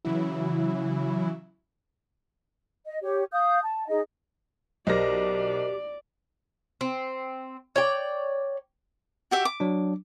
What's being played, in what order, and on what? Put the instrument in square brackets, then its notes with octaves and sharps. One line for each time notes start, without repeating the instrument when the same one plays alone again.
[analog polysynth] C#3 E3 F#3 E4
[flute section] D#5
G4 C#5
F5 D#6 G6
A5
D#4 G#4 D#5
[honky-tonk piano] B1 A#6 [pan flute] G4 [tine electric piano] A#4 C5 D#5 [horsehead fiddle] D5
[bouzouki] C4
C#5 D5 G5
[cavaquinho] F#4 G4 E5
D6
[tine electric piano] F#3 D4